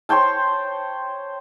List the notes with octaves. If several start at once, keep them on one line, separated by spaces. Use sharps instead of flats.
C5 C#5 G5 A5